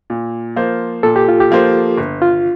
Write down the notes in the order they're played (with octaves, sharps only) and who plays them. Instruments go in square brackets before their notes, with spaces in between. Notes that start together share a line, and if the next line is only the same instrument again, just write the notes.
[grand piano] A#2
F3 A#3 F4 C5
[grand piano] A#2 [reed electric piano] A4
[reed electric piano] G4
F4
G4
[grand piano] F3 A#3 F4 C5
G1
[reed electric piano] F4